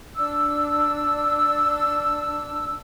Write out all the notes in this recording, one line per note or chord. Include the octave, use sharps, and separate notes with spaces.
D4 E6